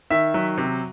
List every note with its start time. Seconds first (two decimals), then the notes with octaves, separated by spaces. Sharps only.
0.10 D#3 E5
0.34 F#3
0.58 C3